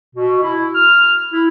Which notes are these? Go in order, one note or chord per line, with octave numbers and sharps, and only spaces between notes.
B2
E4
F6
E4